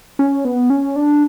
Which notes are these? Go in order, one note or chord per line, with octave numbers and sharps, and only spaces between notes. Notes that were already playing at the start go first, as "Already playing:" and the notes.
C#4
B3
C#4
D4